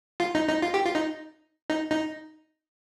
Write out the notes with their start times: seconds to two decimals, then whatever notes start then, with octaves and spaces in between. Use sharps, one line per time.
0.20 F4
0.35 D#4
0.49 D#4
0.62 F4
0.74 G4
0.85 F4
0.95 D#4
1.70 D#4
1.91 D#4